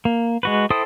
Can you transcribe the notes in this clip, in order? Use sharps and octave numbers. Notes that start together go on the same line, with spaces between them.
A#3
G#3 F#4 B4
E4 A4 C5 G5 D#6